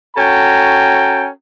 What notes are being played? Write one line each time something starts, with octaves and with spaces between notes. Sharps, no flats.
C#4 F#4 A4 G5 A#5